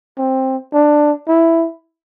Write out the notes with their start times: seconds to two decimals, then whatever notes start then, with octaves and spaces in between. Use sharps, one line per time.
0.18 C4
0.73 D4
1.28 E4